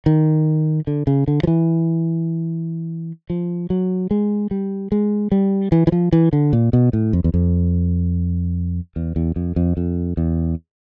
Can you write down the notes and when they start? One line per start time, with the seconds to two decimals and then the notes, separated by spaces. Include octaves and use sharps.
0.06 D#3
0.87 D3
1.07 C#3
1.28 D3
1.43 F3
1.47 E3
3.30 F3
3.70 F#3
4.11 G#3
4.51 G3
4.92 G#3
5.32 G3
5.72 E3
5.87 E3
5.92 F3
6.12 E3
6.33 D3
6.53 A#2
6.73 B2
6.93 A2
7.13 F2
7.24 E2
7.34 F2
8.96 E2
9.16 E2
9.36 F2
9.56 F2
9.77 F2
10.17 E2